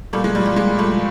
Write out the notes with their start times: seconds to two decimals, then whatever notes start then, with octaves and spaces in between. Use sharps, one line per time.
0.13 A#2 G3 A3
0.24 G#3
0.35 F3 G3
0.46 G3
0.56 A#2 G#3
0.78 F3 G3 A3